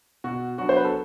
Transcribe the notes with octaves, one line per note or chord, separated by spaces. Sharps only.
B2 F#4
F#3 B3 D4 F#4
C5
B4
A4